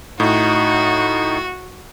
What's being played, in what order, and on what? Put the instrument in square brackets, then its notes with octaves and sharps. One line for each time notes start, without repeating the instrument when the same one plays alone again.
[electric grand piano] A2 [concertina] D#4 [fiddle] F#4